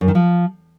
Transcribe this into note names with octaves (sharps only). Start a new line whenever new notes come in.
F#2
D#3
F3